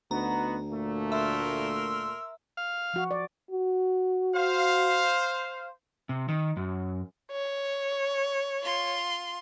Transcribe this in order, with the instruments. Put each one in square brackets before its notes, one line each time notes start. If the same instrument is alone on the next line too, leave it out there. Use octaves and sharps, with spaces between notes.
[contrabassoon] D2 [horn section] B3 D#4 F#4 [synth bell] A#5
[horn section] A#2 A3
[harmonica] A#4 C6 E6 [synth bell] E5
[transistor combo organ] F5
[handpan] F3 F#4
D5
[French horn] F#4
[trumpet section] C5 F5
[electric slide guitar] C3
D#3
F#2
[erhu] C#5
[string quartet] F4 C6